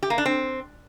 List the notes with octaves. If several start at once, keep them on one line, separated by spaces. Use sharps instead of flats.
G4
A#3
D4
C4